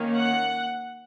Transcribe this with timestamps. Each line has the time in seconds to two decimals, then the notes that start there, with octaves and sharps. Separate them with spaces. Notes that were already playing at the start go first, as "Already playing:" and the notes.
Already playing: D#3 A#3 C#4
0.17 F#5